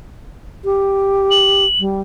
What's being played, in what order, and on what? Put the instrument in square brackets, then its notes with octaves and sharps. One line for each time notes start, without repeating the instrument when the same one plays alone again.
[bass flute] G4
[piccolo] F#7
[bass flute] G3